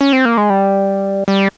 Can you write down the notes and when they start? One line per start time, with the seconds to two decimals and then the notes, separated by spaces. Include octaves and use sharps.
0.01 C#4
0.13 C4
0.25 A#3
0.37 G#3
0.50 G3
1.28 G3